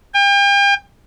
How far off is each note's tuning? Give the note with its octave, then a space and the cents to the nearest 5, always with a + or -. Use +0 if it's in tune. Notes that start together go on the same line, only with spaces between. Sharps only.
G5 +40